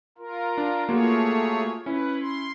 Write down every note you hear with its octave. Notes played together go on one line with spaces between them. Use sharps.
F4 A#4
D4
A3 A#3 F4 F#4 G#4 C#5
C#4 E4 B4
C6